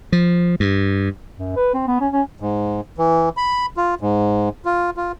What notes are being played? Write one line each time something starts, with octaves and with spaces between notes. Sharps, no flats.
F3
G2
F#2
B4
C4
B3
C#4
C#4
G#2
E3
B5
F4
G#2
F4
F4